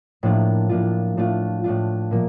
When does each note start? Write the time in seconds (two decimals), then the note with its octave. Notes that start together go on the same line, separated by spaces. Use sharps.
0.23 A2 F3 A#3 D4 F4
0.69 A2 F3 A#3 D4 F4
1.17 A2 A3 D4 F4
1.64 A2 A3 D4 F4
2.11 A#2 F3 A#3